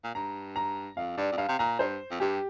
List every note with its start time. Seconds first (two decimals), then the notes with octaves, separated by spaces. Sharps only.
0.04 A#2
0.15 G2 A#5
0.56 A#5
0.97 F2 F5
1.17 G2 D5
1.32 F2
1.37 G2 F5
1.49 C3
1.59 A#2 A#5
1.79 G2 C5
2.11 F2
2.20 G2 G4